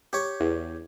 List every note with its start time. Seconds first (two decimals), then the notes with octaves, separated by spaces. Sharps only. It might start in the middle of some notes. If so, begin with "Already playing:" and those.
0.13 G4 C#5
0.40 E2